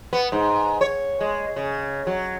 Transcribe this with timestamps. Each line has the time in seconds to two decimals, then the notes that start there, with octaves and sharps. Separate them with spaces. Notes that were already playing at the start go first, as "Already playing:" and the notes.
0.13 B3
0.32 G#2
0.81 C#5
1.21 G#3
1.56 C#3
2.07 F#3